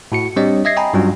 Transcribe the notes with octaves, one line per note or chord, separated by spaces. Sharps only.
A2 F#4 C#7
G3 C4 D4 G4 C#5 D#5
D#5 E5 G#6 A#6 C7
D#5 G5 G#5 A#5 B5
G2 F#3 G3 C#4 F4 F#4